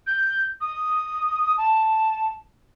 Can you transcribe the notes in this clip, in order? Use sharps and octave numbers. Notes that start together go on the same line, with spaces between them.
G6
D#6
A5